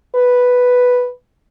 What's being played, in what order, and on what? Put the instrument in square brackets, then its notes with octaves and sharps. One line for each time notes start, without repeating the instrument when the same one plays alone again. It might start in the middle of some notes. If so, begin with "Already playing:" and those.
[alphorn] B4